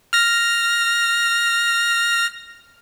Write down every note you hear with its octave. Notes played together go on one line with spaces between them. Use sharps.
F6 A#6